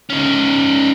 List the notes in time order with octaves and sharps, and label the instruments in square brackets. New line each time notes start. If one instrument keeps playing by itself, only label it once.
[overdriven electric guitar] C#4 D#4